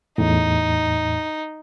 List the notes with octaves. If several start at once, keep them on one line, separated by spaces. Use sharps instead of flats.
E2 A2 D#4